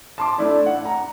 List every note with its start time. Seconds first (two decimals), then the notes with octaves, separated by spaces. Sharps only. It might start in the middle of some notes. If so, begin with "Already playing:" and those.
0.18 A5 C6 D6
0.38 A3 D4 E4 D5
0.66 F#5
0.85 A#5